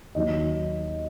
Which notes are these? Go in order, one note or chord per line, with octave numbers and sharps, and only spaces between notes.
D#2 D#3 F#3 D#5